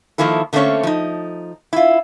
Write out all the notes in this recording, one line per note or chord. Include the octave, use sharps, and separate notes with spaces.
D#3 F3 A#3 E4 A4
D3 A3 A#3 C4 C#4 C#5
F3 D#4
E4 F4